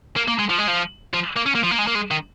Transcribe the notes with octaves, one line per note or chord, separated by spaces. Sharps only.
A#3
A#3
G#3
F3
G#3
F3
F3
A#3
C#4
A#3
F3
A#3
G#3
A#3
G#3
D#3